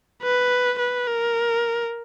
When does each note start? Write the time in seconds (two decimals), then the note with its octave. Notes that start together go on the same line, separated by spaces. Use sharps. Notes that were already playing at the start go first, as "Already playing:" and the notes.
0.23 B4
0.79 B4
1.07 A#4